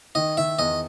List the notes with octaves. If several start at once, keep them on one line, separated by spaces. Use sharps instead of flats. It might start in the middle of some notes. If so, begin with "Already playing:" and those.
D#3 D#5
D#3 E5
E2 D#5